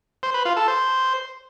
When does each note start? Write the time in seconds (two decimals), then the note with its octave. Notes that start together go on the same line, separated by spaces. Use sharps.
0.23 C5
0.34 B4
0.45 F4
0.57 A4
0.68 C5